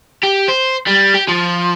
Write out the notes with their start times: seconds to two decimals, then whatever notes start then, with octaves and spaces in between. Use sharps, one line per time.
0.24 G4
0.49 C5
0.87 G3
1.14 G4
1.29 F3